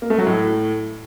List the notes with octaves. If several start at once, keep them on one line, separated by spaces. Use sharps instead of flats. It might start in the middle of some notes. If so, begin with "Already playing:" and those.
A#3
A3
F#3
A2